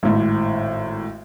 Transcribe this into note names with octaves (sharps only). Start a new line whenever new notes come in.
G#1 A2